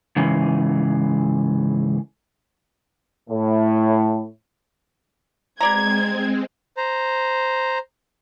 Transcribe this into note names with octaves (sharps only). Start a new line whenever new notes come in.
G#2 C#3 E3
A2
B2 G#3 C4 D5 A#5 G#6
C5 A#5